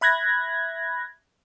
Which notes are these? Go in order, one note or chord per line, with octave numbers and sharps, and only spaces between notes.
E5 B5 F#6 G#6 A#6